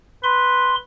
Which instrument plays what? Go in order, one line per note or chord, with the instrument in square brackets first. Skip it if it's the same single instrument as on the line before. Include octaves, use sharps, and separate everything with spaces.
[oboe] B4 [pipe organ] C6